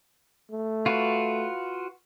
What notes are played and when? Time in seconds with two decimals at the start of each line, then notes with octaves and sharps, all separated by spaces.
0.51 A3
0.86 F4 F#4 B4